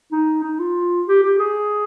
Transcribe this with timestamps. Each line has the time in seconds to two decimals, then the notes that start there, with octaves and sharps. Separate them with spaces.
0.12 D#4
0.43 D#4
0.59 F4
1.07 G4
1.23 G4
1.39 G#4